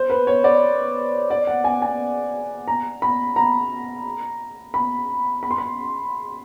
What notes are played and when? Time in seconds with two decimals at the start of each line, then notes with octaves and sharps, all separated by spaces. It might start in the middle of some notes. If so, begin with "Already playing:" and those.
Already playing: C5
0.10 B4
0.27 C#5
0.44 D5
1.30 D5
1.47 F#5
1.64 G#5
1.82 G#5
2.68 A#5
3.02 B5
3.36 A#5
4.74 B5
5.43 B5
5.51 C6
5.58 B5